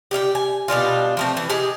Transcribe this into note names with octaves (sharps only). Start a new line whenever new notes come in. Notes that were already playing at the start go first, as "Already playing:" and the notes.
G4 D5 E5 G5
G#5
B2 G3 D4 F4
F3 A3 C4
E3
G4 G#4 D#5